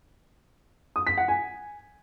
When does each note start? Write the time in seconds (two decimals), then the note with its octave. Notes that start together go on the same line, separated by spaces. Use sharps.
0.96 D#6
1.07 B6
1.17 F#5
1.28 G#5